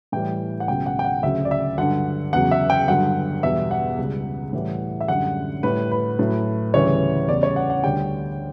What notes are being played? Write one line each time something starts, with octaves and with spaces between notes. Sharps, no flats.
A2 E3 G3 G5
F#5
C#2 B2 F#3 G5
F#5
G5
F#5
D2 C#3 F#3 E5
D5
E5
G2 D3 F#3 F#5
E2 C#3 F#3 F#5
E5
G5
G2 D3 F#3 F#5
E2 B2 G3 E5
F#5
C#2 C#3 G3
A2 E3 G3
E5
F#2 D3 G3 F#5
A2 G3 B4
B4
A2 F#3
D2 C#3 E3 G3 C#5
E2 C#3 G3 D5
C#5
F#5
F#5
D2 D3 G3 G5